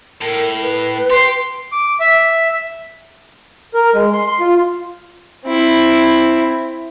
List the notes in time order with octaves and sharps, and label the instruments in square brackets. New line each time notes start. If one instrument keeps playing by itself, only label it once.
[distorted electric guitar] A2 [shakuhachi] A#4
[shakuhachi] B4
[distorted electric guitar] G4 [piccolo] C6
[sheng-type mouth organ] D6
E5
[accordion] A#4
G#3
C6
C6
F4
[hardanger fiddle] C4 E4